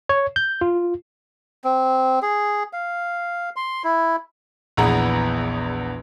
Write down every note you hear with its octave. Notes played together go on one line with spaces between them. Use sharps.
C#5
G6
F4
C4
G#4
F5
C6
E4
A#1 E2 B3 G#4 A#5